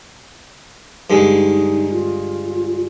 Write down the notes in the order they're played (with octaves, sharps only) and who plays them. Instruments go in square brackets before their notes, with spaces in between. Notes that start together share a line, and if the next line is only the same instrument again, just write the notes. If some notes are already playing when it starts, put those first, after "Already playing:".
[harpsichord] G2 D3 G#3 [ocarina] D#4
[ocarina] F4